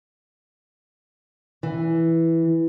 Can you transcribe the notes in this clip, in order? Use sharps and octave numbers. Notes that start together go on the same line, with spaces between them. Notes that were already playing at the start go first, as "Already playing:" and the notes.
E3